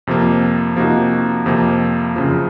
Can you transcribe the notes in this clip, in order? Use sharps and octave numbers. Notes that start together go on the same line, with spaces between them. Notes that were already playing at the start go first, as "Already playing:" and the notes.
F2 C3 F3 A#3
C3 F3 A#3 D#4 F#4
F2 C3 F3 A#3
F#2 C#3 F3